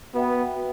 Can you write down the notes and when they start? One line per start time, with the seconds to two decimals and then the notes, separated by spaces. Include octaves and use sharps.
0.14 B3 F#4 B4 E5 G5
0.56 F#4 B4